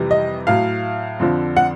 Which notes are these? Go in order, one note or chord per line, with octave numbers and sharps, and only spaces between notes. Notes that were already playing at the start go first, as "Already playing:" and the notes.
Already playing: F2 C3 E3 G3
D#5
A2 F#3 F5
F2 D3 F3
F#5